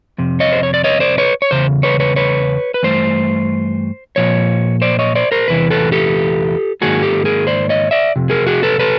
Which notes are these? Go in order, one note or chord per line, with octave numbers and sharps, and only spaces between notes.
F2 C3
C#5 D#5
C5
C#5
D5
C#5 D#5
C5 D5
B4 C#5
C#5
E2 C#3 C5
B4 C#5
B4 C#5
B4 C#5
B4
G2 E3 A3 C5
A#2 F3 C#5
C5 D5
C#5 D#5
C5 D5
A#4 C5
E2 C3 E3 B4
A4 B4
G4 A4
G#2 D#3 F#3 A#3 F#4 G#4
G4 A4
G#4 A#4
C5 D5
C#5 D#5
D5 E5
F2 C3
G#4 A#4
F#4 G#4
A4 B4
A4 B4